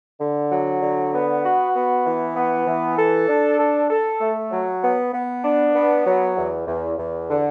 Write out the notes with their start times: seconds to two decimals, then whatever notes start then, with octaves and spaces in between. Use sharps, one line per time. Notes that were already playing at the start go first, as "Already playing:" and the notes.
0.20 D3
0.51 F#3
0.82 D3
1.13 B3
1.44 F#4
1.75 B3
2.06 E3
2.37 B3
2.67 E3
2.97 A4
3.28 D4
3.59 A4
3.90 A4
4.21 A3
4.51 F#3
4.83 B3
5.14 B3
5.44 D4
5.75 B3
6.06 F#3
6.37 E2
6.67 E2
6.98 E2
7.29 D3